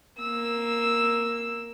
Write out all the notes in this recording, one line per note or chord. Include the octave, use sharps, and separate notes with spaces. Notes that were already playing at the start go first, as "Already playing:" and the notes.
A#3 E6